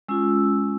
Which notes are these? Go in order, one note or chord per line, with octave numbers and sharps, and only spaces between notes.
G#3 C#4 F4 E6